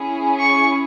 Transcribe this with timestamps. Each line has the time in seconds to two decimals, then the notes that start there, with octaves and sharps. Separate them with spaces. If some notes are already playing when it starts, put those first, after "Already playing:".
Already playing: C#4 E4 G#4
0.38 C#6